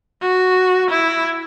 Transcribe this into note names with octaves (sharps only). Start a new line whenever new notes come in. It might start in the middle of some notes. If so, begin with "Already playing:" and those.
F#4
E4